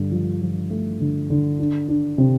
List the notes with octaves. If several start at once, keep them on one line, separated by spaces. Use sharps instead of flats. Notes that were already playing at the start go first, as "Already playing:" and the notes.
Already playing: G2 D3
F3
F3
A3
D3
D3
D4
D4
C3